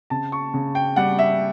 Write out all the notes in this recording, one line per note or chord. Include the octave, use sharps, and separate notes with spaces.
C#3 A5
C#6
C#3
G5
G3 F#5
E5